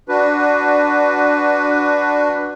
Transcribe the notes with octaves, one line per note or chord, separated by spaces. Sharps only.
D4 F#4 B4